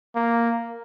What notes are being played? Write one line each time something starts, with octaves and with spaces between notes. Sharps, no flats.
A#3